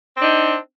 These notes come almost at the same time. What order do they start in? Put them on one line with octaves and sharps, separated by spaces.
C4 D4 D#4